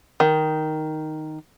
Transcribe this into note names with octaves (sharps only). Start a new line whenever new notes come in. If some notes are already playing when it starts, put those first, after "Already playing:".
D#3